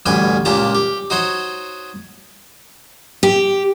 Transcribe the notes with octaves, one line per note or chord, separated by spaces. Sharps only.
A1 D2 G2 G5 G#5 B5
C#2 A#2 G4 A5 A#5
G4
D#4 F#4 C5 C#5 D#5
G4